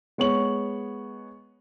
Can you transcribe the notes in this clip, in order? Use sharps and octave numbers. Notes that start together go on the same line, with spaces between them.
G#3 B3 C#5 C#6 F#7